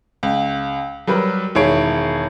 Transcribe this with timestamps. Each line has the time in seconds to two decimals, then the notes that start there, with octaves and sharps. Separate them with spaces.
0.23 C#2
1.07 F#3 G3 A#4 B4
1.55 E1 D#3 E4 G#4 C#5 D7